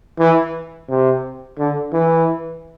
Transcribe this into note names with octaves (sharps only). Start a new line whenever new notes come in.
E3
C3
D3
E3